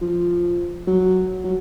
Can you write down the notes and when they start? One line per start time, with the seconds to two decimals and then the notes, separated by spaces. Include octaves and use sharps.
0.01 F3
0.87 F#3
1.44 F#3